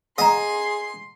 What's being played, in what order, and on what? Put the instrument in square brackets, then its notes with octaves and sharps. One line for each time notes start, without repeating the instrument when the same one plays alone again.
[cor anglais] G#4 [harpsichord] D#5 [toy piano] F#5 A#5 [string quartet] C6